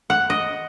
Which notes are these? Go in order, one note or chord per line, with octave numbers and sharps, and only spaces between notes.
F#5
D#5